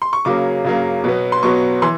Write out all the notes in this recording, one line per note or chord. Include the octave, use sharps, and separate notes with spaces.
C6
C#6
C#3 F#3 A#3 D6
C#3 F#3 A#3
B2 F#3 B3
C6
B2 F#3 B3 C#6
E3 C6